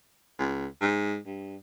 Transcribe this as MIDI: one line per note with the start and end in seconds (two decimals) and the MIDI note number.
0.39 0.66 37
0.82 1.18 44
1.26 1.57 43